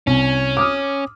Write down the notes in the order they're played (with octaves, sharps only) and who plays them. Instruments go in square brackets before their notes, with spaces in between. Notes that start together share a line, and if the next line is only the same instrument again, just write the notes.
[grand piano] C2 [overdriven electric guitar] C#4
[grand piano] D6 D#6 F6